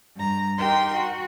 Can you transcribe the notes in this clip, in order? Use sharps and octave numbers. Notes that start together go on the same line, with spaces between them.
G2 A#5
D#4 G4 A#4 G5 C6
F#4